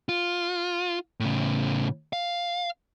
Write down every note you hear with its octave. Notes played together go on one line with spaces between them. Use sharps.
F4
A2 C#3
F5